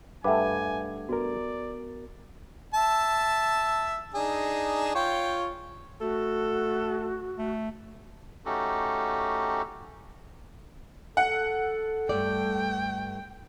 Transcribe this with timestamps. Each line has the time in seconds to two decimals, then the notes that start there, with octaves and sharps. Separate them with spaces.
0.24 G2 A3 B4 E5 F#5 G#5 D6
1.09 B3 F#4 A#4 D5
2.74 E5 A5
4.14 D4 D#4 G#4
4.95 F4 C#5 G5
6.01 A3 F#4 A4
7.38 A3
8.45 A3 C#4 D#4 F#4 G4 A4
11.17 A4 F#5
12.09 G2 A3 D5 G5